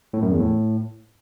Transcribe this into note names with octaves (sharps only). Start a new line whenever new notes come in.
A2
F#2
E2
A2